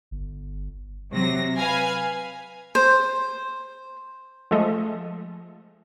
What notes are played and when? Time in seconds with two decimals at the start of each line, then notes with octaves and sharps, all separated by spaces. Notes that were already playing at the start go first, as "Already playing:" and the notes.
0.11 G1
1.11 C3 F#3 A#6
1.57 B4 F5 G#5
2.75 C5
4.51 F3 G#3 A3 A4 D#5